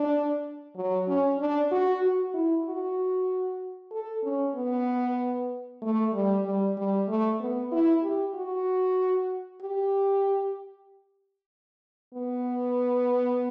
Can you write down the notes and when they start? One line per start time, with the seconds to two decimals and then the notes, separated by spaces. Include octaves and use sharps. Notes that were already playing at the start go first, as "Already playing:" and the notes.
Already playing: D4
0.76 F#3
1.08 C#4
1.39 D4
1.71 F#4
2.02 F#4
2.34 E4
2.66 F#4
3.92 A4
4.24 C#4
4.55 B3
5.82 A3
6.14 G3
6.45 G3
6.77 G3
7.08 A3
7.40 B3
7.72 E4
8.03 G4
8.35 F#4
9.61 G4
12.14 B3